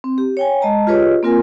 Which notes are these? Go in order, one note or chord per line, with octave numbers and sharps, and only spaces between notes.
C4
G4
C#5 G5 G#5
G#3 D#5 A5 A#5
F4 G4 G#4 B4 C#5 D#5
A#3 C4 F4 A#4 G#5